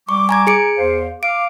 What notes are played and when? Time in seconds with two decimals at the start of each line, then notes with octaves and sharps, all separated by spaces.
0.09 G3 C#6 D6
0.29 G#5 A#5 G#6
0.47 G#4 C#7 D7
0.77 E2 C5 F5
1.23 F5 D6 D7